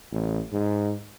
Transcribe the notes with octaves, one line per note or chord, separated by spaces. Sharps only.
A1
G#2